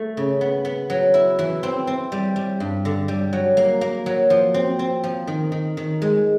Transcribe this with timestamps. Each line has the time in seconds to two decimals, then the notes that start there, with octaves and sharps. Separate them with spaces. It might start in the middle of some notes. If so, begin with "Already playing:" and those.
Already playing: A3
0.17 C#3
0.41 B3
0.65 B3
0.90 F#3
1.14 E4
1.39 E3
1.63 C4
1.87 C4
2.12 G3
2.36 G3
2.60 G2
2.85 D3
3.08 G3
3.33 F#3
3.57 A#3
3.81 A#3
4.06 F#3
4.30 F3
4.54 C4
4.79 C4
5.04 F3
5.27 D#3
5.52 D#3
5.77 D#3
6.02 G#3